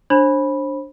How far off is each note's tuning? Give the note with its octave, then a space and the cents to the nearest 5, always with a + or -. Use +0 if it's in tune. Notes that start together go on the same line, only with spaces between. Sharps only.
D4 +0 C5 +35 B5 -10